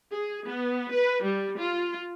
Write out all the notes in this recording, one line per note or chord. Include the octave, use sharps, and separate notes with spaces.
G#4
B3
B4
G3
F4